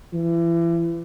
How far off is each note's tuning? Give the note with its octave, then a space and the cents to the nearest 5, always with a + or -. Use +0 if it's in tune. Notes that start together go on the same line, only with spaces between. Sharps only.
E3 +35